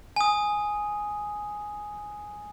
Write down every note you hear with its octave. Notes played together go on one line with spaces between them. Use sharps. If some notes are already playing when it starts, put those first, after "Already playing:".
G#5 D#6